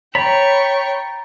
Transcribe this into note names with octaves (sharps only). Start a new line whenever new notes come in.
C#5 G5 A#5 B5 C#6 A6